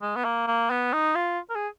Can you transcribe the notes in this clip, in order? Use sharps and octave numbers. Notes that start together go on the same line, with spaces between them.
G#3
B3
A#3
A#3
B3
D#4
F4
A#4
G#4